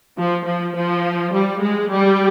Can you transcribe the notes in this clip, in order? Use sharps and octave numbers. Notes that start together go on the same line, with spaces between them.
F3
F3
F3
G3
G#3
G3